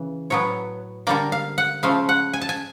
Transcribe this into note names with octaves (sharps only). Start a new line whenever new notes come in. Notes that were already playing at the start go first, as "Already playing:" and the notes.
Already playing: C#3 E3
A2 F#3 B3 C#5
D3 G3 A#3 D5
F5
F#5
C#3 F3 A3 F5
F#5
G#5
A5
G#5